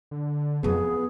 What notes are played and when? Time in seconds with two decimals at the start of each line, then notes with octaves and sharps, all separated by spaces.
0.11 D3
0.63 F2 B3 E4 G#4